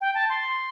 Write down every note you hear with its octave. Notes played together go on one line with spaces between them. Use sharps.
G5
A5
C6